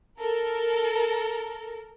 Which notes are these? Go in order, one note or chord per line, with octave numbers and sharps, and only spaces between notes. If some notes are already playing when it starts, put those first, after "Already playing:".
A4 A#4